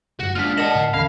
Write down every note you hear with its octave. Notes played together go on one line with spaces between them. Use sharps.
G1 F#2 F#4
G#3 D4 F4 F6 B6
A#4 D5 D#5 F#5 A5 E7
A2 D3
E2 D3 C#4 F5